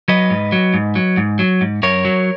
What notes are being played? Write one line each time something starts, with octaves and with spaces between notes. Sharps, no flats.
F#3 B4 D#5
G#2
F#3
G#2
F#3
G#2
F#3
G#2
F#2 A#4 C#5
F#3